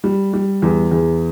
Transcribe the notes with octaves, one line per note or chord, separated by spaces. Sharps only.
G3
G3
E2
E2